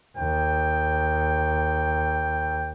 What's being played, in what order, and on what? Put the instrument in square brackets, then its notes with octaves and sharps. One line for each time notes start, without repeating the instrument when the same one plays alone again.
[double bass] D#2 [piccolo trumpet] G5